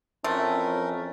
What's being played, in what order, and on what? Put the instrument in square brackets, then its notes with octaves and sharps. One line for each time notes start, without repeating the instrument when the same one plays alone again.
[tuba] F2 [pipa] E3 A3 C4 [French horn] C#4 [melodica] A#4